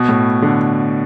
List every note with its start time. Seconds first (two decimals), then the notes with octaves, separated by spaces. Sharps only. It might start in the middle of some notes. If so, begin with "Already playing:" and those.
Already playing: B2
0.09 A2
0.42 D3